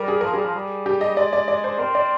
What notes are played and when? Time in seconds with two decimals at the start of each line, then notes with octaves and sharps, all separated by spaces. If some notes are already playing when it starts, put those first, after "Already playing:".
Already playing: G3 A#4
0.08 G#4
0.21 F3 A#4
0.34 G3 G#4
0.44 F3
0.55 G3
0.86 G4
1.01 D#5
1.17 G#3 D5
1.33 D5
1.48 D5
1.64 C5
1.79 C4 A#4
1.95 D5